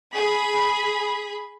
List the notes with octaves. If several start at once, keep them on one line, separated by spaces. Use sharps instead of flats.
G#4 B5